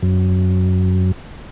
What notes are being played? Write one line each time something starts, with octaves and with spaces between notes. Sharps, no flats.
F#2